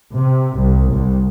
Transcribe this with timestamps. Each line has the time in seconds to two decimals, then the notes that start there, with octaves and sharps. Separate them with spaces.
0.12 C3
0.56 C2
0.91 C2